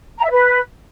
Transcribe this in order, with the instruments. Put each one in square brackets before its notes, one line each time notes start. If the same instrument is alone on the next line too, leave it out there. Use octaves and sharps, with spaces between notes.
[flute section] A#5
E5
B4